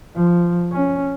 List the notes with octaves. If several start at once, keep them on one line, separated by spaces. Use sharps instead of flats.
F3
C#4